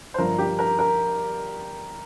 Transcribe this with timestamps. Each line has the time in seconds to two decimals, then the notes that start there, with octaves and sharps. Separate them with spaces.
0.14 C5
0.18 G1 G2 F3 A#4
0.38 G4
0.59 A#4
0.79 A#4